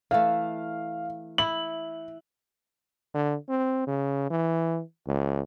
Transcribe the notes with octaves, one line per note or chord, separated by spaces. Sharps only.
E3 A3 F5
E4 F#7
D3
C4
C#3
E3
C#2